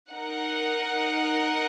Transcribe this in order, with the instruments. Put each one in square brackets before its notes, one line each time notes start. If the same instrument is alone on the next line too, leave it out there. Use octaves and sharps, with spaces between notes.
[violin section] D#4 A#4 F#5